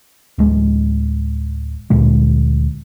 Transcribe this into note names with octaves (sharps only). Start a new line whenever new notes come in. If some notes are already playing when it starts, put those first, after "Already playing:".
D1 G#3
D2 A#2 G#3